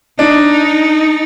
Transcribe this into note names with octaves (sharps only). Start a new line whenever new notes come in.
D4 D#4